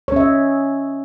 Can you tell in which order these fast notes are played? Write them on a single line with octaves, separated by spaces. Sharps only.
C#5 C#4 E5 D#5